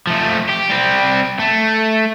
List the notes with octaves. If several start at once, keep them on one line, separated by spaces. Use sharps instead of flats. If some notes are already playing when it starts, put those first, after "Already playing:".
F3 A3
G4
G3 C4
A3